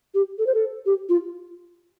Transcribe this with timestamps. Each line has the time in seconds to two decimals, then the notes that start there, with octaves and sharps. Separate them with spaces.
0.14 G4
0.39 A4
0.47 C5
0.55 A4
0.86 G4
1.09 F4